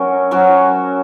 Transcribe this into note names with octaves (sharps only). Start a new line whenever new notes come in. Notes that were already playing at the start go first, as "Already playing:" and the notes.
Already playing: F#3 C#4 F#4 A#4
F#3 C#4 F#4 A#4